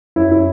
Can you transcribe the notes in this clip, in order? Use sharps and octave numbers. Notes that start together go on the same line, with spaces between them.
F#2 E4
E4